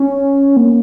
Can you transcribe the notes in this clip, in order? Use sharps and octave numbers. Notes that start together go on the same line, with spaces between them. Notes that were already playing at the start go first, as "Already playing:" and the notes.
Already playing: C#4
A#3